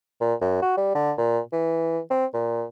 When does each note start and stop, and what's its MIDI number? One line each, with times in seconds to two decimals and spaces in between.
0.21 0.34 46
0.41 0.62 42
0.62 0.76 66
0.77 0.93 55
0.95 1.12 50
1.18 1.40 46
1.53 2.00 52
2.10 2.26 60
2.34 2.64 46